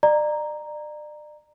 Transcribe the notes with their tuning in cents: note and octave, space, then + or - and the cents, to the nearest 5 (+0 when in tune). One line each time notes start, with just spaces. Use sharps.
D5 +35 A#5 +0